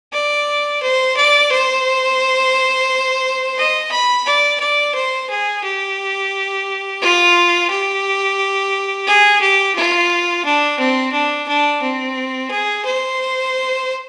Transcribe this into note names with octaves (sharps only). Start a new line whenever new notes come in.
D5
C5
D5
C5
D#5
B5
D5
D5
C5
G#4
G4
F4
G4
G#4
G4
F4
D4
C4
D4
D4
C4
G#4
C5